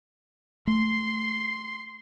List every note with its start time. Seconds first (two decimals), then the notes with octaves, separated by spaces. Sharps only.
0.67 A3 C6 C7